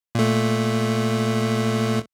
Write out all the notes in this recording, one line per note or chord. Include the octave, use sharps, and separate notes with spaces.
A#2 A3